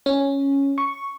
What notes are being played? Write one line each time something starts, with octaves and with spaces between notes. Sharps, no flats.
C#4
C#6